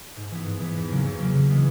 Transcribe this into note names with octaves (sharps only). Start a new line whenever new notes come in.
G#2
E3 B3
G#2
E3 B3
E2
C#3 F#3 A#3
E2
C#3 F#3 A#3
C#3
E3 G#3 B3